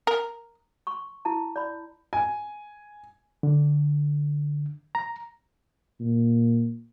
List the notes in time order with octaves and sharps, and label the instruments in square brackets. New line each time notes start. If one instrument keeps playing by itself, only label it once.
[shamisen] A#4
[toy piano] C6 C#6
E4 A5
D5 B5
[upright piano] G#5
[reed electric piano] D3
A#5
[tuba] A#2